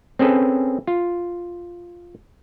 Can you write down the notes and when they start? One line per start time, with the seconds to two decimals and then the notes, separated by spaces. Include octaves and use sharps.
0.19 C4 C#4 G#4 A4 B4
0.87 F4